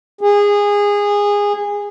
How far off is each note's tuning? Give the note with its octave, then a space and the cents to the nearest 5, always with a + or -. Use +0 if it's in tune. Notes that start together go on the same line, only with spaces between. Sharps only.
G#4 -20